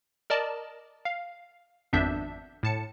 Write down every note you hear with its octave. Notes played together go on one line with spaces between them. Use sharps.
A#4 D5 D#5 A5
F5
G#1 F2 B3 D4 E5 G6
A2 A5 C#7